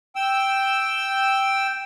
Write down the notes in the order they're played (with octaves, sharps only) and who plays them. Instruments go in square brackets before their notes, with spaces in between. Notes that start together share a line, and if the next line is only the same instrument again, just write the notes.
[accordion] G5 E6